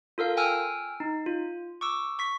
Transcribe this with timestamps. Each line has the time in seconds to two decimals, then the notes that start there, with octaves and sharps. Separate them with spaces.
0.18 F4 A4 A#4 F5
0.37 G5 G#5 E6 F6
1.00 D#4
1.26 F4
1.81 C#6 D6 E6
2.19 C#6 B6